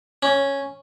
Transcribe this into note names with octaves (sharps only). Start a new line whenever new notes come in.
C#4